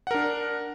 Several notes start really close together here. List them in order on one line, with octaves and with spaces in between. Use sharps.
F#5 A#4 D4